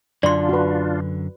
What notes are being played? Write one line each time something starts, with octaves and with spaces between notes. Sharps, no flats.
F#2 D3 D4 F4 D5 C6
F#4 B4